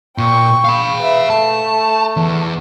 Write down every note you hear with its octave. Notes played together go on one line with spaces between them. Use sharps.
A#2 G5 C#6
F5 B5
B4 E5
A3 A5
E2